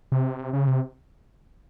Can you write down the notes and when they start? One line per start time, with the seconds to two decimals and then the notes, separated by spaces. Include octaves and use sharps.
0.12 C3
0.53 C#3
0.67 C3